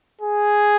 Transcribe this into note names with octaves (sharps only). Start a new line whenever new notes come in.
G#4